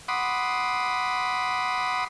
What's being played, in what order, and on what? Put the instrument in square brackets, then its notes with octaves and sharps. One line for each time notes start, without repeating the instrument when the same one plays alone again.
[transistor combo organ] F#5 B5 C6 D6 D#6